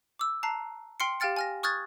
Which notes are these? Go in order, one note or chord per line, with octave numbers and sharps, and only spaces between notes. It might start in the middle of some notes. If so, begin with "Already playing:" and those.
D6 E6
A5 A#5 F#6 C7
G5 C6 F6 C7 C#7
G4 F5 G5 F6 A6 C#7
G#5 F6 A#6
C#6 D#6 F6 F#6 G#6 A6